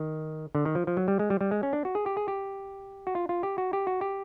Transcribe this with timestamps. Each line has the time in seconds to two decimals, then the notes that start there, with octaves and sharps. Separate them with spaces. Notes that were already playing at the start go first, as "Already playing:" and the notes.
Already playing: D#3
0.55 D3
0.65 D#3
0.75 F3
0.87 F3
0.97 F#3
1.08 G3
1.19 G#3
1.30 G3
1.41 G3
1.51 G#3
1.63 C#4
1.73 D4
1.85 F#4
1.95 G#4
2.06 G4
2.17 G#4
2.28 G4
3.07 F#4
3.15 F4
3.29 F4
3.43 G4
3.58 F#4
3.73 G4
3.87 F#4
4.01 G4